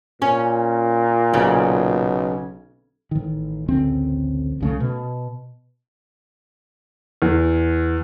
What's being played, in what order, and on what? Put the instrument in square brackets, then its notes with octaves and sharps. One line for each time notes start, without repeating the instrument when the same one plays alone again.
[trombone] A#2 [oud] C#4
[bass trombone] B1 [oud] C#3
[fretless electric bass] A1 D#3
A1 D2 C#3 C4
C2 C#3 A3
B2
[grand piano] E2